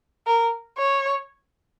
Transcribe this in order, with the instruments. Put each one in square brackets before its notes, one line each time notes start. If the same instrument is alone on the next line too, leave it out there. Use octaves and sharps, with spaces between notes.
[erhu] A#4
C#5